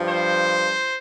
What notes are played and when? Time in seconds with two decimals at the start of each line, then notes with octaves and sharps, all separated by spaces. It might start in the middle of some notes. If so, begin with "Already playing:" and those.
Already playing: G2 F3
0.09 C5